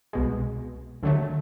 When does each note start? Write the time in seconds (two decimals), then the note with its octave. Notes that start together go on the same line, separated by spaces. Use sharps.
0.13 C2 B2 G#3
1.03 D#2 D3 F#3 A3